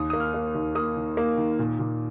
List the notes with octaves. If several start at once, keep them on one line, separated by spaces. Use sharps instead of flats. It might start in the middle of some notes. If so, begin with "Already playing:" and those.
Already playing: D#2 D#6
A#3 D#6
F6
A#3
D#2
A#3 D#6
D#3
A#3
D#3
A#2
A#2